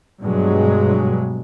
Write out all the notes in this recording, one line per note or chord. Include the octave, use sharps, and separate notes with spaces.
G2 B2 F#3 G#3